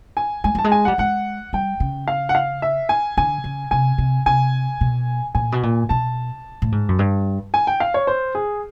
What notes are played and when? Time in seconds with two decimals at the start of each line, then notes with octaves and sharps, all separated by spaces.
0.17 G#5
0.44 G#3 G#5
0.55 G3 A5
0.64 G#3
0.72 G#5
0.85 G3 F#5
0.98 G#3 F#5
1.53 G3 G5
1.80 C#3
2.08 F5
2.29 F#5
2.35 F5
2.62 E5
2.89 G#5
3.17 D3 G#5
3.44 C#3
3.71 C3 G#5
3.98 C3
4.26 C3 G#5
4.81 B2
5.35 A#2 G#5
5.52 B2
5.63 A#2
5.89 B2 A5
6.62 A2
6.72 G#2
6.89 F#2
6.99 G2
7.54 G#5
7.67 G5
7.80 F5
7.94 C#5
8.07 C5
8.35 G#4